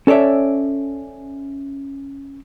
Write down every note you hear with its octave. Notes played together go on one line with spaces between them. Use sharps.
C#4 A4 C#5 D5 E5